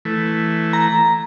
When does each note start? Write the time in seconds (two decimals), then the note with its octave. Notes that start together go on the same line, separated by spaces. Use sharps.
0.05 E3 A3
0.73 A#5